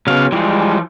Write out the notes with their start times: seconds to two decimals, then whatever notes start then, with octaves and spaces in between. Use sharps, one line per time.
0.07 C#3 F#3 B3 F5
0.32 E3 F3 G3 G#3